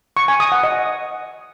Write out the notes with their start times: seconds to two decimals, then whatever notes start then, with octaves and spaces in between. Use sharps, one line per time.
0.17 C#6
0.28 G#5
0.40 D#6
0.52 F#5
0.63 D#5